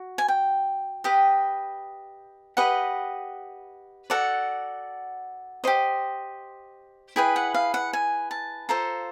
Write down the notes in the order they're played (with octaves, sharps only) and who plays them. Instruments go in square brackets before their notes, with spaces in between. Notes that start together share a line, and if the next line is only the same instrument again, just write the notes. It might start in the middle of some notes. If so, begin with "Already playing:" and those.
Already playing: [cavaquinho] F#4
G#5
G5
G4 B4 D#5
G4 B4 D#5 F#5
F#4 A4 D5 F#5
G4 C5 D#5
E4 G#4 B4 G5
F#5
F5
F#5
G#5
A5
F4 A4 C5 A#5